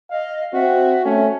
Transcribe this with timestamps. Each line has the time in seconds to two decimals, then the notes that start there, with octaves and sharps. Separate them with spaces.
0.11 D#5 F5
0.53 C4 F#4 E5
1.05 A3 C#4